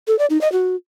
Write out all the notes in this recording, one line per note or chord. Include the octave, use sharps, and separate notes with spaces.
A4
D5
D#4
D#5
F#4